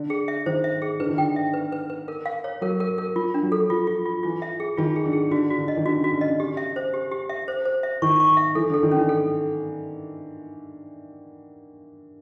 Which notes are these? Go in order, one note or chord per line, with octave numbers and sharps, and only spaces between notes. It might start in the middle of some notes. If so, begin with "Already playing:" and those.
Already playing: D3
G#4
E5
D#3 C5
E5
G#4
D3 B4
D#3
D3 G5
E5
B4
B4
B4
A#4
F5
C#5
F#3 A#4
A#4
A#4
F3 F4
D4
F#3
A4
F3 F4
F4
F4
E3 F4
E5
G#4
D#3 F4
G#4
D3
G#4
D3 F#4
F#4
D3
D#5
D#3
D3 F#4
C#3
F#4
D3
D#5
C#3
G4
E5
C5
G4
G4
E5
C5
C5
E5
D#3 C#6
C#6
E5
E3 A4
D3
A4
D#3
E3 C#4
A4